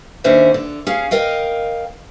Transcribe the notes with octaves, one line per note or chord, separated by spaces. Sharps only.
D#2 C#4 D4 C5 E5
D3
C#4 G#4 F5
A#4 D#5 F5 G5